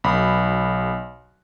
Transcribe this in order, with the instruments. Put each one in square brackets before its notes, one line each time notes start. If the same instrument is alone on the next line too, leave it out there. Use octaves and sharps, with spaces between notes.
[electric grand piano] B1 B5